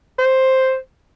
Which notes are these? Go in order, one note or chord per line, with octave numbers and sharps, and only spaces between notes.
C5